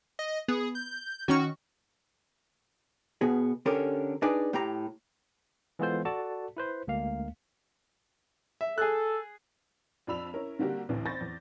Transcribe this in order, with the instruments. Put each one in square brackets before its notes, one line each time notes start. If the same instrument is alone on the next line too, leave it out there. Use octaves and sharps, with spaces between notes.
[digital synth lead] D#5
[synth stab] B3 [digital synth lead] G#4
[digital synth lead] G6
[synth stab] D#3 C#4 C#6 [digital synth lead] F#4
[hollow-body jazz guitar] B2 B3 G#4
D3 C#4 G4 A4 A#4
D4 D#4 G#4 B4 D5
A2 G4 A#5
[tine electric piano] E3 G#3 B3 F4 A4 C5
F#4 A4 D5 A5
E4 B4 C5
D2 G#3 A#3 F5
[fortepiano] E5
[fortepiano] G#4 F#6 [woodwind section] A4
[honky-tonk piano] F2 F3 D4 B5 E6 F7
C#4 E4 A#4
D3 G3 A#3 F#4 G4 A#4
A1 D2 E3
C5 B5 C#6 G6 A6 A#6
E2